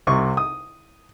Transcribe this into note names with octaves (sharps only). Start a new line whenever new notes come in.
C2 C3 C#6
D#6